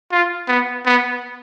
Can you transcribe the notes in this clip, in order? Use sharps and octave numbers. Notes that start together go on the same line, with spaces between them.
F4
B3
B3